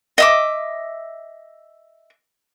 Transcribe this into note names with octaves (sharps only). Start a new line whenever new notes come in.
D#5 E5 D6